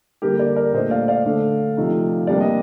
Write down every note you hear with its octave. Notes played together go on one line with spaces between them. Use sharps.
D3 G3 A#3 G4 A#4
A#4 D5
A#4 D5
A#2 A3 D4 C5 D#5
D5 F5
D5 F5
D3 A3 D4
C3 F3 A3 D#4
C3 G3 A#3 D4 D5
D#5